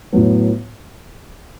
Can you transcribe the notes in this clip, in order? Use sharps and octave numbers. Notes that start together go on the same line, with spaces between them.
A2 F#3 B3